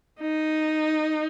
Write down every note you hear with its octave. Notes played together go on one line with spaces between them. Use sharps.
D#4